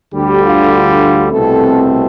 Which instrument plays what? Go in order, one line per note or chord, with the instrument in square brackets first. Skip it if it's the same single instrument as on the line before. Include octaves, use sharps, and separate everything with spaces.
[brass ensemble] D2 D3 G3 G4
F4
F4
C2 B2 A3 C4 A4